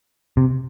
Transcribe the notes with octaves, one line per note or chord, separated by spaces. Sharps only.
C3